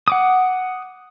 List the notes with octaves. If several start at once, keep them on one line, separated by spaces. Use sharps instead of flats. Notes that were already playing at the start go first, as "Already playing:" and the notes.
F#5 D6 D#6